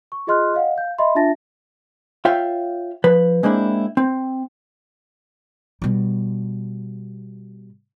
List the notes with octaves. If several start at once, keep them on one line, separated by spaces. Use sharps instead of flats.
C#6
F4 G#4 D#5 C6 F6 F#6
D#5 F5 F#5
F5 G6
D#5 E5 B5 C6
D4 F4 E5 A5 A6 A#6
F4 C#5 E5 F5 G5
F3 B4
G#3 A#3 C4 D4 E4
C4
B2 G3